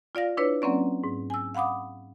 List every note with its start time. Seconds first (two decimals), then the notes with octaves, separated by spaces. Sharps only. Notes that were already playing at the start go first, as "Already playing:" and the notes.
0.15 F4 D5 F5 A#6
0.37 D4 E4 B4 C#5
0.62 F#3 A#3 C4 C#4 D5
1.04 G#2
1.30 G#5 E6
1.55 F5 F#5 B5 D6 D#6